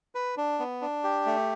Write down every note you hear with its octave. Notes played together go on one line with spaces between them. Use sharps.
B4
D4
B3
D4
G4
A3